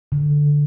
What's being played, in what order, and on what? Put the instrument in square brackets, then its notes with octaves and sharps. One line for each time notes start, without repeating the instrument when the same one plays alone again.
[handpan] D3